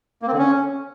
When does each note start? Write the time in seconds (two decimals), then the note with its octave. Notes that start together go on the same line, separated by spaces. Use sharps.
0.22 A#3
0.28 C4
0.33 D3
0.38 C#4